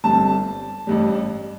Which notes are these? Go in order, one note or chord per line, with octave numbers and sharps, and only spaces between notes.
G1 G2 G3 C4 A5
A1 G2 G3